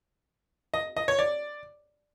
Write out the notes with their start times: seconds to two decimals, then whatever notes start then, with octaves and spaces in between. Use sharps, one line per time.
0.74 D#5
0.97 D#5
1.08 C#5
1.19 D5